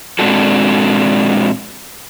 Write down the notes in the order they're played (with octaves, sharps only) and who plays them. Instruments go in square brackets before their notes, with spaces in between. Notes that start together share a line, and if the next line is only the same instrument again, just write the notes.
[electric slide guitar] A#2 G#3 C4 D4 F#4 A4